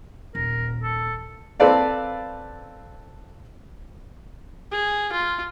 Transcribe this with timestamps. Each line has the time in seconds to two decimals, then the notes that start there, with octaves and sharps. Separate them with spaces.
0.35 D#1 A#4
0.83 A4
1.60 C4 A4 B4 D5 F5
4.72 G#4
5.12 F4